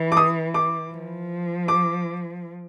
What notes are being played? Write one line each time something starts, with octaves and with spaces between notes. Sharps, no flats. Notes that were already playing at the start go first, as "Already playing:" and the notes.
Already playing: E3
D6
D#6
D6
F3
D6